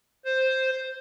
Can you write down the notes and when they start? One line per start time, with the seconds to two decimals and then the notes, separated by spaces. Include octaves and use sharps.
0.25 C5